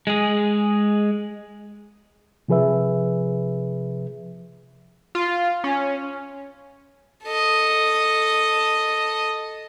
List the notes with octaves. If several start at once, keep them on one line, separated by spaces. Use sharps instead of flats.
G#3 G#4
C3 F3 G#4 B4 E5
F4
C#4
A4 D#5